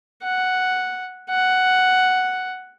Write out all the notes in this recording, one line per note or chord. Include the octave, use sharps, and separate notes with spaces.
F#5
F#5